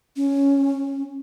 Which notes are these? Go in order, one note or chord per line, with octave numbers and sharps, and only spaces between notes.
C#4